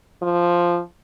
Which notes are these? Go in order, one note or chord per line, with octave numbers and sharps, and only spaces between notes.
F3